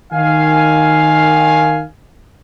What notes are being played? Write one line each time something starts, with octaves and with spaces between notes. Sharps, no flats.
D#3 F5 G#5